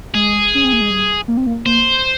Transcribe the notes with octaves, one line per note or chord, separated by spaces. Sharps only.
G#3 G#4
C#4
C4
A#3
G#3
G3
A#3
C4
A#3
A#3 C5